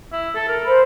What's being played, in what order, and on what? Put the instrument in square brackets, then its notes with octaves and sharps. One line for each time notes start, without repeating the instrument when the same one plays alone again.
[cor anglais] E4
A4
A#4
[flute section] C5 B5